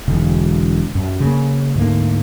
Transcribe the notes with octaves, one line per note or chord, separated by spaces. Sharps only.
E1 D3
F#2
C#3 A#3
D2 G#2 D3 A#3